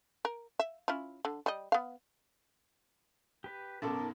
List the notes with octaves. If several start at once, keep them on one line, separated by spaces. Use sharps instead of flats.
A#4
E5
C#4 E4 F4
D3
G3 D#5
B3 F5
G4 B4
B1 F#2 B3 C#4 A4 A#4 A5 D6
B3 D#4